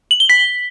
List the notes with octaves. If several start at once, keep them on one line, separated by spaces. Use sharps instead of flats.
F#7
G7
B6